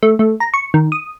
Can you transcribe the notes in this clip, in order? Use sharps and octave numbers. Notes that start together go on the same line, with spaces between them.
A3
A3
A#5
C#6
D#3
D#6